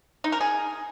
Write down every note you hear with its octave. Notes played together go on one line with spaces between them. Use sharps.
D#4
A#4
G#4